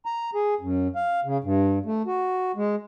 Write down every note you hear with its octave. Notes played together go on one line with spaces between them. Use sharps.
A#5
G#4
F#2
F5
C#3
G2
A3
F#4
G#3